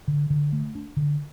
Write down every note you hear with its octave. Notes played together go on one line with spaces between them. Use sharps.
D3
D3
A3
D4
D3